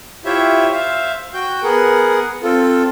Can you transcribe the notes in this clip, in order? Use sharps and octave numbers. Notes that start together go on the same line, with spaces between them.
E4 F4 G4 C5 C#5 E5
C5 E5 F5
F#4 G5 G6
B3 G#4 A#4 F#5
C4 F4 A4